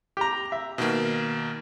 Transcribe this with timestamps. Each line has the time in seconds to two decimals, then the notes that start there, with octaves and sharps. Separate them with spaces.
0.17 G4 A#5
0.52 E5
0.78 B2 D#3 A#3